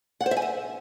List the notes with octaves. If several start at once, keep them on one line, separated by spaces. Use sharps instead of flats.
F#5
C5
E5
G#5
E5